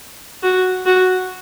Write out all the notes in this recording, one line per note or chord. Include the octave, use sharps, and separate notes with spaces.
F#4
F#4